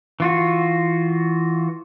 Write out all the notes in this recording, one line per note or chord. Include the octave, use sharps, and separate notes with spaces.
E3 F4 F#4